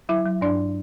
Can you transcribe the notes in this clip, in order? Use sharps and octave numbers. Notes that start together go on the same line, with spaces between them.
F#3 E4 E5
F#3
G2 D4 D5